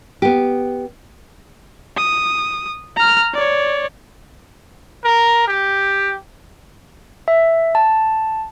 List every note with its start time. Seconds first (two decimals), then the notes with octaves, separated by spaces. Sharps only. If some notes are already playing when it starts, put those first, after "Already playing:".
0.22 B3 G4
1.97 D#6
2.97 A#5 F6
3.34 C#5 D5
5.04 A#4
5.48 G4
7.28 E5
7.75 A5